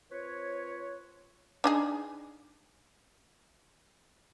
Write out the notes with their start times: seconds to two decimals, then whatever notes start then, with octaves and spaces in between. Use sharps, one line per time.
0.12 C4 F4 B4 C#5
1.64 D4 D#4 G#4